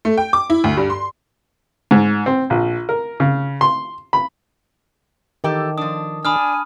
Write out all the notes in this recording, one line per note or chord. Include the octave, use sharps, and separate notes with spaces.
A3
G5
D6
E4
D2
G2
C6
G#2
C4
A#1
A#4
C#3
C6
B5
D#3 E3 G4 A4
F3 D4 D#6
D4 G#5 B5 D#6 F6